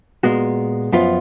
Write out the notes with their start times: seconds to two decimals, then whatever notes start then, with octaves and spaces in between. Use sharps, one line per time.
0.23 A#2 G#3 B3 F#4
0.92 F#2 F3 B3 F4